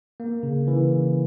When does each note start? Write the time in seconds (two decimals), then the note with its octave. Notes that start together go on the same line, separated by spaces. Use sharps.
0.20 A#3
0.43 C#3
0.68 E3